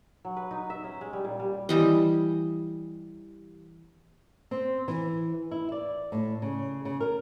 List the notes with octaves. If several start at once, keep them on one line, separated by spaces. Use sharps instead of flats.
F#3
B4
D#4
E5
C#4
G#3
G3
A#2
G3
E3 G3 D#5
C4
E3
E4
D5
A2
C#3
C#3
A#4